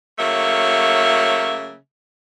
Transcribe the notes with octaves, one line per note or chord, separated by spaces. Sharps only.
C#3 F#3 A3 A#3 E5